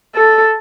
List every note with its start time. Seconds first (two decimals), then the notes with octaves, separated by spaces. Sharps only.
0.15 A4